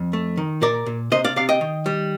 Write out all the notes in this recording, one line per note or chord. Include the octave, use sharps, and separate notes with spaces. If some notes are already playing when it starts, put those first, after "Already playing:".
Already playing: F2
A3
D#3
A#2 A#4 D5
A#2
C3 C5 D#5
D5 F5
C3 D5 F5
D#5 G5
D#3
G3